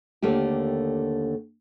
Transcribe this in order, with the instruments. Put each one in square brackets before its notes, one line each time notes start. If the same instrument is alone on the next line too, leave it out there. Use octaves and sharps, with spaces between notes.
[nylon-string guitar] D#2 D3 A3 A#3 G4